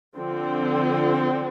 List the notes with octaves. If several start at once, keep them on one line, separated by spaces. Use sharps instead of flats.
D3 F3 C4